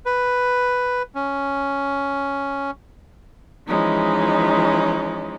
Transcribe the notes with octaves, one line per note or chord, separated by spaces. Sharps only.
B4
C#4
E3 F3 G#3 C#4 D#4